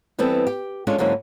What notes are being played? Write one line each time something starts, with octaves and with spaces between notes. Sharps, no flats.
E3 G3 B3 C4 E4 A4
G4
G#3 C#4 D4 F4 A4
G#2 D3 F#3 A#3 C#4 E4